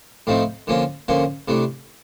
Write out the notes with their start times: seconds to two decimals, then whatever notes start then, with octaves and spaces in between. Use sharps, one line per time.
0.27 A2 F3 A3 C4 D#4
0.67 D3 F3 A#3 C#4 F4
1.08 D3 F3 A#3 C#4 F4
1.48 C3 E3 A3 D4